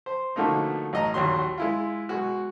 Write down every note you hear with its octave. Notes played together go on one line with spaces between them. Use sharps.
C5
B2 D3 F3 A3 A#3 D#4
A1 D#5 A#5
A#1 D#2 F#3 C6
G#3 E4 F4
B2 G#3 F#4